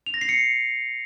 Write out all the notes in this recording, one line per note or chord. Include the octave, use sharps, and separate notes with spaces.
F7
A#6
C7
C#7